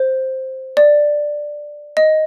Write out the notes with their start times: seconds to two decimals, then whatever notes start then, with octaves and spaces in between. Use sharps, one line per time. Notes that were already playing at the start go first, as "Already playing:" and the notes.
Already playing: C5
0.77 D5
1.97 D#5